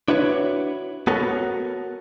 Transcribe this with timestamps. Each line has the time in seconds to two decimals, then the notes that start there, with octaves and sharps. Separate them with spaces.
0.08 D4 E4 F#4 B4 C#5
1.07 B3 F#4 A4 A#4 C#5